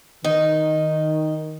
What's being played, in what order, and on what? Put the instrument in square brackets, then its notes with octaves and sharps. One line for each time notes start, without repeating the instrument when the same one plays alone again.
[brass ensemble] D#3 [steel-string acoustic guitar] D#4